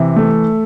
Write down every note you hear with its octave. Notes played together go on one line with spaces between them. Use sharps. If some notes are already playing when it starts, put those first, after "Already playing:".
Already playing: C3 E3
A3